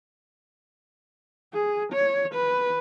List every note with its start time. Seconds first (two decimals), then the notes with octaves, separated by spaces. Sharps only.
1.54 G#4
1.92 C#5
2.34 B4